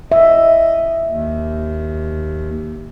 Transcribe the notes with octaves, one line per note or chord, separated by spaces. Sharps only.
D#5 E5
D#2